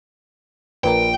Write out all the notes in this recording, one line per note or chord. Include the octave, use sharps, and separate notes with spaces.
A#1 A#2 A#4 B4 G5